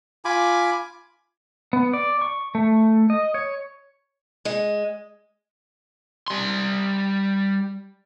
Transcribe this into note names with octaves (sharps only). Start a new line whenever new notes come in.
F4 G#5 B5 D6
B3
D5
C#6
A3
D#5
C#5
G#3
G3 C6